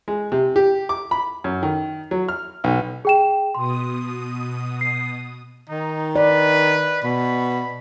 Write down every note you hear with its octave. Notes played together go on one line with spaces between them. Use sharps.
G#3
C3
G4
D6
B5
F#2
D#3
F#3
F6
B1
G#4 G5 E7
B2 C6 D#6
C7
D#3 D#4
B4 D5
B2 B5